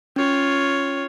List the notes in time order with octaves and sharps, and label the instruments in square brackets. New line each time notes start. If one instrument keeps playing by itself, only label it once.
[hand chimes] C#4 [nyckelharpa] F4 C#5